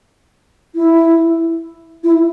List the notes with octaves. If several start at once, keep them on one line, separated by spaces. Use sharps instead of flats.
E4
E4